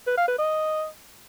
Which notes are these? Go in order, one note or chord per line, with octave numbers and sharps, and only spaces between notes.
B4
F5
B4
D#5